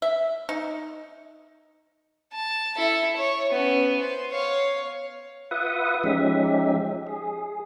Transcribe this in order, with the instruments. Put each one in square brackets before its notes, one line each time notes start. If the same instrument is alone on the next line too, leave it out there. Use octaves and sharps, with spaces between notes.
[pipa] E5
D#4
[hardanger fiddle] A5
E4 A4
C#5
B3 C#4
C5
C#5 F5
[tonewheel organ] F4 B4 E5 F#5 D#6
F3 G#3 C#4 D#4 G4 E5
G#4